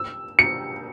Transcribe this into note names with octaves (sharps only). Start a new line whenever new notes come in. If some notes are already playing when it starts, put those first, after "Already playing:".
Already playing: E6
C#7